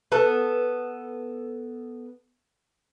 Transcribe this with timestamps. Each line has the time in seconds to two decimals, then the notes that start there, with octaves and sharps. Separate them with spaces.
0.12 B3 A4